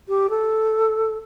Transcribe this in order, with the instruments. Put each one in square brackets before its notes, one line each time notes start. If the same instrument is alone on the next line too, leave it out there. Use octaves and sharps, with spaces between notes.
[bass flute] G4
A4